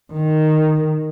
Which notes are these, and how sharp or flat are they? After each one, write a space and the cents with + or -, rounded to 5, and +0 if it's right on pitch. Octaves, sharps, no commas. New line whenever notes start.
D#3 -5